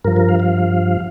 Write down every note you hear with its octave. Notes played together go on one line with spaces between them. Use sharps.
G2 F3 A#4
A#4
F5
F5